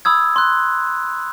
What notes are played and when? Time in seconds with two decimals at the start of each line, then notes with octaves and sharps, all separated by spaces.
0.05 B5 D#6 E6 G#6
0.36 C6 F#6